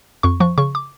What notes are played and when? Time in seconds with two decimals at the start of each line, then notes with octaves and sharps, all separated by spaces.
0.23 F2 C#6
0.40 F3 C#6
0.58 C#3 C#6
0.75 D6